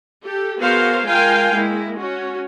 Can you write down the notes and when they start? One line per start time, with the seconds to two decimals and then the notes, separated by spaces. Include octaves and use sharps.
0.23 G4 A4
0.60 B3 F#4 G#4 A#4 C5 F5
1.08 G#3 F4 A#4 F5 G5 G#5
1.53 G#3 A#3 E4
1.98 C#4 F#4